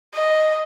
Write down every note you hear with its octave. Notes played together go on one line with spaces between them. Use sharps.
D#5